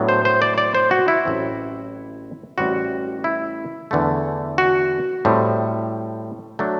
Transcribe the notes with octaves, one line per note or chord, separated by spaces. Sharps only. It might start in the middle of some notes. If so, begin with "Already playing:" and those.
Already playing: A2 F#3 B3 D4
C5
C5
D5
D5
C5
F#4
E4
A1 A2 F#3 C4
A1 A2 G3 C4 F#4
E4
E2 D3 A3
F#4
A2 G3 C4
F#3 A3 D4